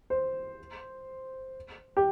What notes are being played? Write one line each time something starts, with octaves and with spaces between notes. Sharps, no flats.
C5
G4